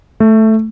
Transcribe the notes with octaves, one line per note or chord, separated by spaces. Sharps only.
A3